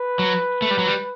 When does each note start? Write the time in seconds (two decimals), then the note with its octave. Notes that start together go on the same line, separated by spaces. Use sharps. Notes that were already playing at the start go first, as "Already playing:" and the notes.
Already playing: B4
0.19 F#3
0.62 A3
0.71 G3
0.79 F#3
0.87 G3